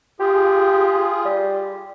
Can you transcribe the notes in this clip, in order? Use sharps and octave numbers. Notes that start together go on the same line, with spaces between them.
F4 G4 G#4
G3